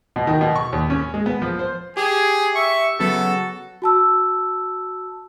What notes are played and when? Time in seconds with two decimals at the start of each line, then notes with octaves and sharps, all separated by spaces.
0.16 B2
0.27 D#3
0.41 B2
0.55 C#6
0.73 D#2
0.90 C#4
1.14 G#3
1.26 B3
1.42 F3
1.59 C5
1.97 G4 G#4 G#5
2.55 E5 C#6
3.00 C#3 F#3 B3 F#4 A4
3.82 F#4 A5 E6